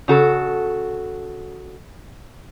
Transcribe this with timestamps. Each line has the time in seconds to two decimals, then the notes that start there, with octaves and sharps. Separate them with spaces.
0.08 C#3 F#4 A4